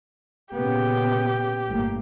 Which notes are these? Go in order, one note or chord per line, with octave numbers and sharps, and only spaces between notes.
A#2 C#3 B3 G4
G1 A2 A#3